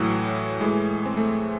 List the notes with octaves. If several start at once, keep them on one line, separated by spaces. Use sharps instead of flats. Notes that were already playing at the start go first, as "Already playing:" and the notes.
Already playing: A2 E3 F#3
A2 E3 G#3
C4
A3